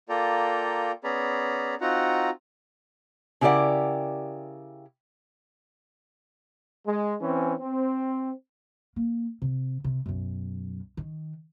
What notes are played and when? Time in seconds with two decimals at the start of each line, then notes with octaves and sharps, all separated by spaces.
0.09 A#3 F4 A4 D5 G5 A#5
1.04 B3 C#4 G#4 D5 A#5 B5
1.81 C4 D#4 F4 F#4 F#5 A#5
3.41 C#3 E4 G4 A#4 D5 F#5
6.87 G#3
7.21 E3 C4 C#4
7.61 C4
8.96 A#3
9.42 C3
9.84 C3
10.06 B1 F#2
10.97 D#3